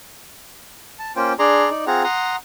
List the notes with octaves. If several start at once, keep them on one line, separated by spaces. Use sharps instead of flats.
A5
A#3 C#4 F4 C5 G5
D4 G#4 D5 A#5 C6
D#4 D5
C4 F4 G#4 F#5 A#5
F#5 A#5 C6 D#6